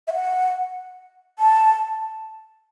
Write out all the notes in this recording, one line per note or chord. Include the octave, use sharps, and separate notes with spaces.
E5
F#5
A5